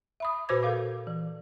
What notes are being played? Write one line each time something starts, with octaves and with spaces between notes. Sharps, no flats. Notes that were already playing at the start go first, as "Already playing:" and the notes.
E5 B5 D#6
A#2 F#4 B4 C5 D6 G#6
A4 A#4 F5 D6
E3